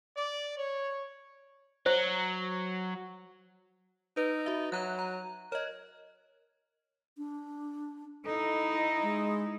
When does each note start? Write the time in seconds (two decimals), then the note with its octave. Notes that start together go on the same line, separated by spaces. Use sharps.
0.16 D5
0.56 C#5
1.86 F#3 C5
4.17 D#4 B4
4.46 F#4 E5
4.72 F#3 A#5 F#6
4.99 A#5
5.52 A#4 C#5 D#5
7.18 D4
8.25 D#4 E4 A4
9.03 G#3